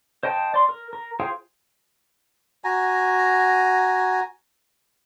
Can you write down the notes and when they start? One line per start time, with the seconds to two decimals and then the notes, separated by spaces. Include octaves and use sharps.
0.23 C5 D#5 G5 A5
0.54 D5 C6
0.69 A#4
0.93 A#4
1.20 F4 G#4 C5 F5 G5
2.64 F#4 G#5 A#5